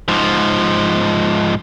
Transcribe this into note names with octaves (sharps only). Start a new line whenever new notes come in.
G#2 F3